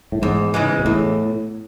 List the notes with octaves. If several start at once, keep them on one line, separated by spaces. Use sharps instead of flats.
A2
E2 G#2
C#3 E3 G#3
B2
E2 A2